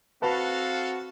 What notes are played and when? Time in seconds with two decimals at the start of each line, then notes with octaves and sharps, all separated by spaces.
0.22 C4 F#4 A4 B4 F5 A5